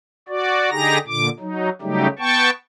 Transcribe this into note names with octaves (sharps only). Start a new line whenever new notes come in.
F#4 D5
D3 D#4 G4 G#4 A#5 A#6
A#2 D3 D6
F#3 D#4
C#3 F#3 G3 A3 D#4 G4
B3 G5 A5 C#6